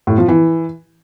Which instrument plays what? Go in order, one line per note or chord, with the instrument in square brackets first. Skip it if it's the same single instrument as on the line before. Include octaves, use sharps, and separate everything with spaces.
[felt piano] A2
F3
E3